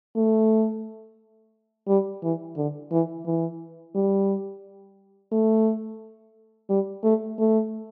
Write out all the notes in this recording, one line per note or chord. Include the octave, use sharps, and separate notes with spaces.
A3
G3
E3
D3
E3
E3
G3
A3
G3
A3
A3